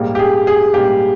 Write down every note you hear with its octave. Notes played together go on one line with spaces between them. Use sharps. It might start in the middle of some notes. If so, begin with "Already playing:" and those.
Already playing: A#1 G#2 G3 A#3
G4
G#4
G#4
A#1 G#2 G3 A#3 G4